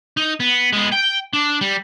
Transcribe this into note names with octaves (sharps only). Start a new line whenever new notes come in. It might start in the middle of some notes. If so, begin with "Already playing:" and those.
D#4
B3
G#3 B3
G5
D4
G3